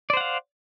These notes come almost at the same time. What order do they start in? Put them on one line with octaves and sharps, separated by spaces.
D5 C5 F#5 F5